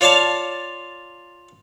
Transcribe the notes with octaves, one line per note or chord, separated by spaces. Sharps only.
F4 C#5 D5 F5 A5